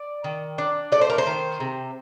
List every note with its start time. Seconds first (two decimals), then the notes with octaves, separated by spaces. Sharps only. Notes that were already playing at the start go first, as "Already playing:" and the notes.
Already playing: D5
0.24 D#3
0.58 D4
0.92 A3 D5
1.01 C5
1.10 A#4
1.18 C5
1.27 D#3
1.60 C3